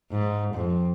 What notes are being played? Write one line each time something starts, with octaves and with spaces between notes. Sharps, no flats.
G#2
F2